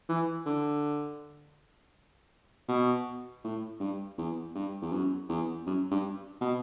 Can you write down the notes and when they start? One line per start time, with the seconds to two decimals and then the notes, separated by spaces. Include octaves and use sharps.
0.09 E3
0.46 D3
2.69 B2
3.44 A2
3.80 G2
4.18 E2
4.55 G2
4.81 E2
4.92 F#2
5.29 E2
5.67 F#2
5.91 G2
6.41 B2